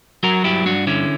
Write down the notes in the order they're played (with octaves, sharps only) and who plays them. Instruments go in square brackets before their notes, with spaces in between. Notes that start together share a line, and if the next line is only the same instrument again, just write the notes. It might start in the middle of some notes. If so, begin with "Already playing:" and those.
[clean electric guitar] F#3 F#4 A#4
G2 E4 G4
G2 D4 F#4
D3 C#4 E4